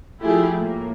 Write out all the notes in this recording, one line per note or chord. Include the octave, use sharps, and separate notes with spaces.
F3 A3 E4 F4 G4 G#4
A2 A#3